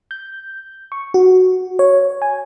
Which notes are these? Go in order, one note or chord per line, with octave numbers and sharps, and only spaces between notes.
G6
C#6
F#4
C#5
G#5